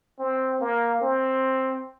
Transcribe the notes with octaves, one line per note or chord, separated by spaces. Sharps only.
C4
A#3
C4